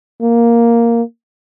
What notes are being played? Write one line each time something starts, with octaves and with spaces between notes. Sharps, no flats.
A#3